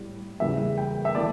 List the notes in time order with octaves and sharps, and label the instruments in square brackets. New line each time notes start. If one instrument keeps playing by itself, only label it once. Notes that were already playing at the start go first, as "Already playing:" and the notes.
Already playing: [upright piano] A2 G3
E2 C#3 E3 G3 E5
G5
E5
E3 A3 D5